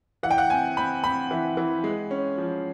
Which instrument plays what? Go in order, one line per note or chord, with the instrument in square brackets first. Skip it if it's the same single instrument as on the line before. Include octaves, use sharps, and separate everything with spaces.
[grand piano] E3 [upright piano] F#5
[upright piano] G5
F#5
[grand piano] C4 [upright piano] G#5
[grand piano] C4 [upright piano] B5
[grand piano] C4 [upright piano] B5
[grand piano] E3
E3
G#3
C#4
F3